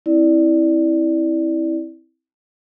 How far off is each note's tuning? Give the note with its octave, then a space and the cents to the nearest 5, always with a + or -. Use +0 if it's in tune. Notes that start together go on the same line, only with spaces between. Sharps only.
C4 +0 E4 -20 D5 +0